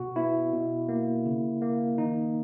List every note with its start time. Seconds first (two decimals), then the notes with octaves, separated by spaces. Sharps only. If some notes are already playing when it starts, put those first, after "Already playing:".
Already playing: B2 F#4
0.16 B3 E4
0.53 B2
0.89 A#3
1.26 C#3
1.62 A#3
1.98 D#3 D#4